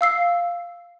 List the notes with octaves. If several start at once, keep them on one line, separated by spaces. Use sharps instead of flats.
F5 E6 C7